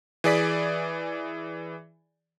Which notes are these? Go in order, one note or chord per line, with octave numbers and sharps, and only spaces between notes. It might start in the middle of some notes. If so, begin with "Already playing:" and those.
E3 G#4 D5 B6